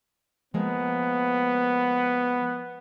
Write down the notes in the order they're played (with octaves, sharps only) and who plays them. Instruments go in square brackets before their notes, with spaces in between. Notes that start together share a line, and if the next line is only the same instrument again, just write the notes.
[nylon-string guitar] F3 G#3 A#3 [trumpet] B3